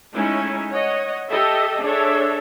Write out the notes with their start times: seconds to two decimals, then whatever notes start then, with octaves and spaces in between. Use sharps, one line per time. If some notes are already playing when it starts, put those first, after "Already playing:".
0.14 G#3 A3 C#4 D#4 E4
0.72 C#5 D#5 F#5
1.29 G4 A4 D#5 E5
1.82 D4 G#4 A4 C#5 E5